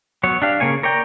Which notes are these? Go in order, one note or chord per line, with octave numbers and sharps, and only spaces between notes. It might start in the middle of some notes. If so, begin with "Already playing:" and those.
F#3 B3 C#5
D4 G4 F5
C#3 F3 A#3 C#5 G#5
A#4 C#5 D5 G5 A#5